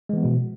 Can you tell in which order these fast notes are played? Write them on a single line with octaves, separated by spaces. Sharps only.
G#3 E3 B3 F3 B2